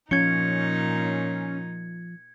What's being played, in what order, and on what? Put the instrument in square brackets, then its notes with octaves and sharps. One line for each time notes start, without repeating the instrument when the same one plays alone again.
[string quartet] A#2 D#4 [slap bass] F3 [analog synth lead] C#4 [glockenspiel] G#6 C#7